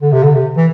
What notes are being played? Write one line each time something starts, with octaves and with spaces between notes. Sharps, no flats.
D3
C3
D3
C3
E3